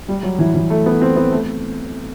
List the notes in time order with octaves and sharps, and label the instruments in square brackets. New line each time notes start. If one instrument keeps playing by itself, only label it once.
[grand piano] G3
F#3
E3
E3
A3
B3
C4
B3
A3